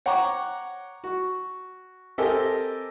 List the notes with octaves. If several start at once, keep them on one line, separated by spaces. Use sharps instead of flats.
C#5 F#5 G5 A#5 C#6 D6
F#4
C4 G4 A4 A#4 D#5 G#5